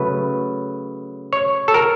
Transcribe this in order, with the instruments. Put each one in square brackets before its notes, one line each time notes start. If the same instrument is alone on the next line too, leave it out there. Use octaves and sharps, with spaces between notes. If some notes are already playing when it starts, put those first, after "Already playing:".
Already playing: [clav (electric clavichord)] C#3 F#3 A3 B4
C#5
A4
A#4